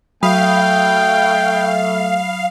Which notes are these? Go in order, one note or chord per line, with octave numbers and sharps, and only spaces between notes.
F#3 A3 F5 G5 B5 D#6